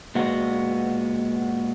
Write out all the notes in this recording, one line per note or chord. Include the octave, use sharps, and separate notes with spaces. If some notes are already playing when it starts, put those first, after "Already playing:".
A#2 G#3 B3 F#4